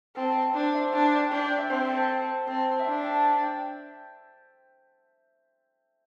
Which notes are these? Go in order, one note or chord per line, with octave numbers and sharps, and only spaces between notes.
C4 A4
D4 C5
E5
D4 A5
G5
D4 G5
G5
E5
C4 C5
A4
C4 A4
E5
D4 G5
A5
G5
G5